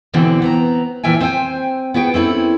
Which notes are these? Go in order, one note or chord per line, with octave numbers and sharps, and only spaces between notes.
B2 D3 E3 C4 D4 F#4
B3 C4 A#5
A#2 E3 F3 E5 G5 G#5
C4 C5 C#5 E5 G5 G#5
B3 F#4 G#4 G5
C4 C#4 E4 A4